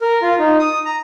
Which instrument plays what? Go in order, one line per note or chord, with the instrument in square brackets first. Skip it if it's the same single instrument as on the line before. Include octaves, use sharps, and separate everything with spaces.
[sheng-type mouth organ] A#4
F4
D#4
D#6
A#5